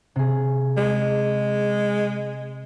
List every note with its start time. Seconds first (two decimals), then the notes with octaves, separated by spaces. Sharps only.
0.16 C3 G#4
0.77 G#3